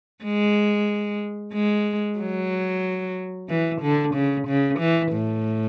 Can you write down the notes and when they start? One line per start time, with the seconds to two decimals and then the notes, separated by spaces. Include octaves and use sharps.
0.24 G#3
1.53 G#3
2.19 F#3
3.49 E3
3.82 D3
4.14 C#3
4.48 C#3
4.79 E3
5.12 A2